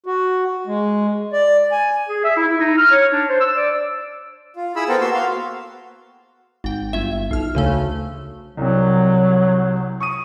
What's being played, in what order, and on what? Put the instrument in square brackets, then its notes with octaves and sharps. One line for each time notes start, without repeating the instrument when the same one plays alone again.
[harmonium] F#4
G#3
D5
G#5
[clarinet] G#4
E5
E4
E4
D#4
F6
C#5
D4
C5
E6
D5
[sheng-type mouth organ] F4
E4 G#4 B5 E6
B3 A4 A#4 C5 G5
A#3 B3 F#4 C6 E6
F#4 F5 C6
[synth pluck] G#1 G5
G1 E5
B1 F6
D2 C#3 A3
[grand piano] C2 C3 [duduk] F#3
[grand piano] C#6 D#6 D#7